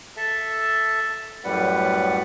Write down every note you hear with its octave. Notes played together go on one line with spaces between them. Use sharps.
A4 E5 A5
F#2 A2 G3 B4 F#5